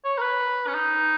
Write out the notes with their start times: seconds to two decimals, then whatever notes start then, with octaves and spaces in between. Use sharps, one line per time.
0.04 C#5
0.18 A#4
0.22 B4
0.67 C#4
0.74 D#4